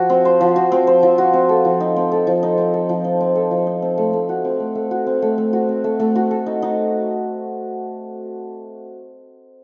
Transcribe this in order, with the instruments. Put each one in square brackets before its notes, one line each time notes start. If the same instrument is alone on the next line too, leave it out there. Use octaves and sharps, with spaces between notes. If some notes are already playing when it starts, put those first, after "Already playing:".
Already playing: [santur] F3 F#4
C4
C5
F3
F#4
C4
C5
F3
F#4
C4
A4
F3
D#4
C4
A4
F3
D#4
C4
A4
F3
D#4
C4
A4
F3
D#4
C4
A3
A3
F#4
C4
A3
A3
F#4
C4
A3
A3
F#4
C4
A3
A3
F#4
A4
D#4
D#4